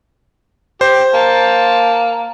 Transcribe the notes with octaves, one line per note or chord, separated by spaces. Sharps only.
G4 C5
A#3 A5